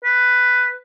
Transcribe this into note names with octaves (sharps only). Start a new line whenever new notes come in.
B4